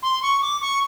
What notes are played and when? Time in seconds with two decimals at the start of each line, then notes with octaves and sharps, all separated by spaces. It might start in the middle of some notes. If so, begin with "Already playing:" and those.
0.03 C6
0.22 C#6
0.42 D6
0.61 C#6